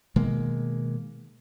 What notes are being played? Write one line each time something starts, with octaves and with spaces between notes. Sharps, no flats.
B2 D#3 G#3 A#3